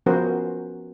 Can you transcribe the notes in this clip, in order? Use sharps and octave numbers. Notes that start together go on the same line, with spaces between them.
F3 B3 C#4 F#4 A#4 C5